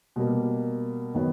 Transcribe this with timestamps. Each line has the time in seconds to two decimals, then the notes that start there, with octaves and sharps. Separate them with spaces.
0.16 B2 G3 A#3
1.14 D#3 F#3 B3